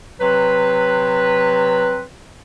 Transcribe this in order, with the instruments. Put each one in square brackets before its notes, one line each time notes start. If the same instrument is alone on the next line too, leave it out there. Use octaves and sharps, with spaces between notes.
[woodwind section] C3 F#3 C4 B4